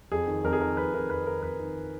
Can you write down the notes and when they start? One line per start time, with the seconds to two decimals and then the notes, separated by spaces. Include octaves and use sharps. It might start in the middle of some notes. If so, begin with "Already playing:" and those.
0.12 F2 G#4
0.27 D#3
0.44 F2 A#4
0.53 G#4
0.61 D#3 A#4
0.77 F2 B4
0.94 D#3 A#4
1.10 F2 B4
1.26 D#3 A#4
1.43 F2 B4
1.60 D#3